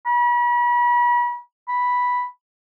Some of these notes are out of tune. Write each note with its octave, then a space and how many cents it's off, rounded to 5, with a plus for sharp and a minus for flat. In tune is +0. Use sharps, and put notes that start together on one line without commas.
B5 -40
B5 -5